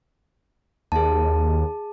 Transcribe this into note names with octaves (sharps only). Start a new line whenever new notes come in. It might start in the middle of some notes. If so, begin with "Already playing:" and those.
D#2 G#4 A5